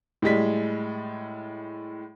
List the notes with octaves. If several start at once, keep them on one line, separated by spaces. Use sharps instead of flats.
A2 G3 G#3 B6